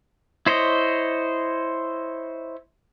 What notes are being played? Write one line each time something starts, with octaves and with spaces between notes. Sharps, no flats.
E4 C5 C#5 D#5